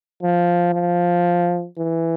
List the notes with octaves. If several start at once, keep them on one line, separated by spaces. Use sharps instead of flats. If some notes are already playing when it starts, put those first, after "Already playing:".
F3
F3
E3